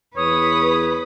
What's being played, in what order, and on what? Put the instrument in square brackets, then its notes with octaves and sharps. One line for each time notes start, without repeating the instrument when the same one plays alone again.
[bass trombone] E2 [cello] B4 [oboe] C#5 [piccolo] D#6